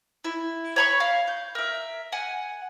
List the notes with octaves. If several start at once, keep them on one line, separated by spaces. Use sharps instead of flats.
E4
C#5 B5 C#6
F5
G6
A#4 E5
F#5 G#5